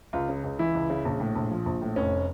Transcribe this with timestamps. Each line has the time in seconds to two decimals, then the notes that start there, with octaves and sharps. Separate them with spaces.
0.13 C#2 F4
0.29 C#3
0.44 C#2
0.59 E3 E4
0.75 C#2
0.90 C#3
1.05 A#1
1.20 A2
1.36 A#1
1.51 F3
1.66 A#1
1.81 A2
1.96 F1 C#4